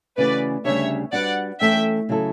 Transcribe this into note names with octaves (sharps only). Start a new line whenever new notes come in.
C#3 E3 A3 C#4 F#4 B4 D5
D2 C#3 G3 D4 G4 C#5 E5
G3 D4 F#4 B4 D5 F#5
E3 A3 C#4 E4 A4 E5 G5
C#3 F#3 A3 E4 A4